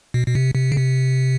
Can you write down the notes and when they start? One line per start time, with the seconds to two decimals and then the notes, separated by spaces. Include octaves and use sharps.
0.14 B2
0.27 B2
0.35 C3
0.55 C3
0.72 C#3
0.77 C3